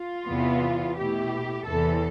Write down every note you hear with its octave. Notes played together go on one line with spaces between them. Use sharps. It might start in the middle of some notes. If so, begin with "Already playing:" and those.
Already playing: F4
E2 C3 E3 B3
B2 A3 E4 G4
E2 C3 E3 A4